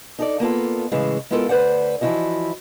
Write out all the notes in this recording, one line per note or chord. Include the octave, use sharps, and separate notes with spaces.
D#4 A4 D5
A#3 B3 F4 A4
A2 C#3 E3 G#3
G#3 B3 E4 F4 A4 A#4
D2 B4 C5 D5 F#5
E3 F3 G#3 E4 F#4 D#5